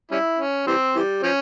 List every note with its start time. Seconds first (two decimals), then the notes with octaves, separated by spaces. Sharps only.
0.11 G3 C#4 E4
0.39 C#4
0.67 E3 G3 C4
0.95 E3 G3
1.23 F3 C#4